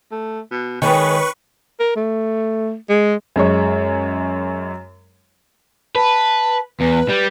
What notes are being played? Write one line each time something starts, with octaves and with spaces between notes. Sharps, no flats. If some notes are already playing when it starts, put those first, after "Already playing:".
A3
B2
D#3 G#3 B4 C#5 C#6
A#4
A3
G#3
F#2 G#3 C#5
B4 A5
E2 B4
G3